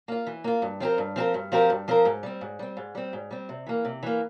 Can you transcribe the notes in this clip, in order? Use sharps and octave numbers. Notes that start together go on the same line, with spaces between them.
A#3 F4
E3
A#3 F4
G2
F3 C4 G4 A#4
G2
F3 C4 G4 A#4
G2
F3 C4 G4 A#4
G2
F3 C4 G4 A#4
G#2
G3 C4
G#2
G3 C4
G#2
G3 C4
G#2
G3 C4
C3
E3 A#3
C3
E3 A#3